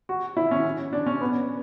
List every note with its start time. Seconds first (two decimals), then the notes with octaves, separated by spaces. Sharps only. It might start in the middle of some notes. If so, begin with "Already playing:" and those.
0.09 F#4
0.37 E4
0.51 C#4
0.93 D4
1.06 C#4
1.21 B3